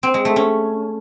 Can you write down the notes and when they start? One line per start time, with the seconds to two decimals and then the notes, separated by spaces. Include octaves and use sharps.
0.03 C4
0.14 G#3
0.25 A3
0.36 C#4